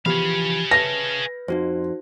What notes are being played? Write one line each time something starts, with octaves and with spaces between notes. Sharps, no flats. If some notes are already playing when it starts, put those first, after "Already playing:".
E3 F3 B3 G4 G#4 F5 B5
B4 C#5 E5 A5 A#6
F2 D#4 F#4 C5